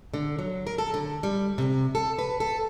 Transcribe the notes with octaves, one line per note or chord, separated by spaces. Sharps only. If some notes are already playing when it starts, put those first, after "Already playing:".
D3
F#3
A#4
A4
D3
G3
C3
A4
B4
A4